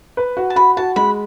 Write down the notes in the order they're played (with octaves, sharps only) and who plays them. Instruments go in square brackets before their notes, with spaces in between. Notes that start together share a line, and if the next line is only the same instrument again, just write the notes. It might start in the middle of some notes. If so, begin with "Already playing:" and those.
[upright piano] B4
F#4
[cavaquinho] A5
[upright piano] F#4 [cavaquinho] B5
[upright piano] F#4 [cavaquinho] A5
[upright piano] G#3 [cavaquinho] B5